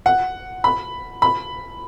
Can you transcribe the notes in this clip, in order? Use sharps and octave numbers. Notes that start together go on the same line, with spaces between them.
F#5
B5
B5